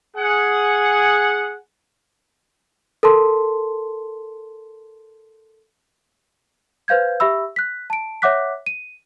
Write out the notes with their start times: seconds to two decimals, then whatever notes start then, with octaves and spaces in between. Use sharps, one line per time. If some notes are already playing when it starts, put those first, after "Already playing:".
0.17 G#4 F#5
3.03 A4 A#4 A5 C6
6.88 B4 C5 F5 G6 G#6
7.20 G4 E5 B5 E6
7.56 F#6 B6
7.90 A5 D7
8.22 C#5 E5 F#5 D6 F#6 B6
8.66 D#7